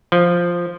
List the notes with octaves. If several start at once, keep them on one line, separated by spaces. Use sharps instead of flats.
F3